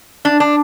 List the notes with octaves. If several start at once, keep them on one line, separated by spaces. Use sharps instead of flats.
D4
D4